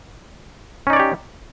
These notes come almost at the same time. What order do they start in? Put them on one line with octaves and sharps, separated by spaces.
C#4 D#4 D5 C#5 G4